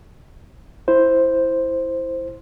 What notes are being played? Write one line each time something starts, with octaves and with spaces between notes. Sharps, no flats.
E4 C5